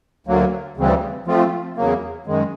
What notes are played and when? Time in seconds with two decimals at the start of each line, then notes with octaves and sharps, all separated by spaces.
0.27 D2 D3 F#3 A#3
0.77 D2 C#3 E3 G3 C4
1.26 F3 A3 C4 F4
1.77 E2 C#3 F#3 A#3
2.26 F#2 D#3 G#3